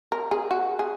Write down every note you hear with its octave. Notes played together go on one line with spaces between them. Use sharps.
A#4
G#4
F#4
G#4